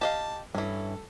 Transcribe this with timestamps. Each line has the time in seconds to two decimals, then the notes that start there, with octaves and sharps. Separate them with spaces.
0.01 G4 D#5 F5 A5
0.55 G2 E3 C#4 A4